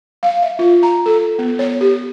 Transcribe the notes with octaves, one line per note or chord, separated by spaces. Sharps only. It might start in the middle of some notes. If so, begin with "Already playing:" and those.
F5
E5
F4
A#5
A4
B3
C#5
G4